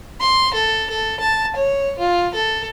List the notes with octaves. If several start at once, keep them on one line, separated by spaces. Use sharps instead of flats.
C6
A4
A4
A5
C#5
F4
A4